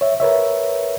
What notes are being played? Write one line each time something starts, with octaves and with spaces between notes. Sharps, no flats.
C#5 E5
A#4 B4 C#5 E5